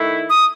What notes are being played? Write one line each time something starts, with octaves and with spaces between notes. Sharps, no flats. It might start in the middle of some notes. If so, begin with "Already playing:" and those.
Already playing: D#3 A3 E4
D#6